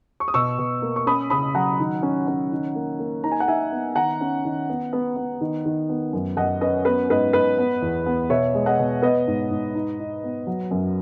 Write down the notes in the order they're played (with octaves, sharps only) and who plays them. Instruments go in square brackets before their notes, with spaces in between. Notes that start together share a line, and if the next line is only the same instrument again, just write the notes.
[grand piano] C#6
D#6
B2 C#6 E6
B2
A#3
C#6
C#4 B5 D#6
C#3 B5 D#6
F#3 F#5 A#5
D#3
C#4
C#4
D#3
A#3
A#3
D#4 A#5
G#5
F#5
D#4 E5 G#5
B3
D#3 F#5 A#5
C#4
D#3
B3
B3
B3
D#3
D#3
B3
F#2
F#2 D#5 F#5
C#4 B4 D#5
B3 B4
G#2 B4 D#5
G#2 B4 D#5
B3
E2
B3
B2 C#5 E5
G#3
D#5 F#5
B2
B3 B4 D#5
G#2
G#2
D#4
D#4
B3
F#3
F#2